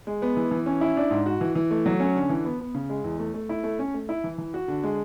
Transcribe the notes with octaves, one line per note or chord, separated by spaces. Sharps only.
G#3
B3
E3
E3
C#4
E4
D4
G#2
F#4
E3
E3
A3
F#3
C#4
D3
E3
B3
B3
C#3
G#3
E2
A3
A3
E4
A3
C#4
A3
E4
E3
E3
F#4
D3
G#3